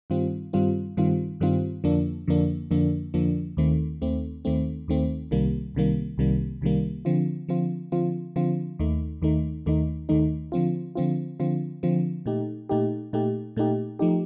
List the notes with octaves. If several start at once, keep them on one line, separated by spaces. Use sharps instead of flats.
G2 D#3 G3 C4 F4
G2 D#3 G3 C4 F4
G2 D#3 G3 C4 F4
G2 D#3 G3 C4 F4
F2 D3 F3 A#3 D4
F2 D3 F3 A#3 D4
F2 D3 F3 A#3 D4
F2 D3 F3 A#3 D4
D#2 D#3 A3 C4
D#2 D#3 A3 C4
D#2 D#3 A3 C4
D#2 D#3 A3 C4
C2 C3 D#3 G3 A#3
C2 C3 D#3 G3 A#3
C2 C3 D#3 G3 A#3
C2 C3 D#3 G3 A#3
D3 F3 C4 F4
D3 F3 C4 F4
D3 F3 C4 F4
D3 F3 C4 F4
D#2 D#3 A3 D#4
D#2 D#3 A3 D#4
D#2 D#3 A3 D#4
D#2 D#3 A3 D#4
D3 F3 C4 F4
D3 F3 C4 F4
D3 F3 C4 F4
D3 F3 C4 F4
A#2 A3 D#4 G4
A#2 A3 D#4 G4
A#2 A3 D#4 G4
A#2 A3 D#4 G4
F3 A3 D#4 G4